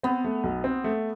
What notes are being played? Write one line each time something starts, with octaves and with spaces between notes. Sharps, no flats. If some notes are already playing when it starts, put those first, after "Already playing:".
B3 C4
A3
B1
C4
A3